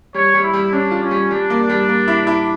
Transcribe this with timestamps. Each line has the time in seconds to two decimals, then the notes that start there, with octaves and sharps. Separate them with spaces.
0.14 G3 C#5
0.34 G3
0.43 E4
0.54 G3
0.72 C#4 D4
0.91 F4
1.02 C#4
1.11 G3
1.31 G3 D4
1.50 A#3
1.59 D4
1.69 G3
1.88 A#3
2.08 E4
2.27 E4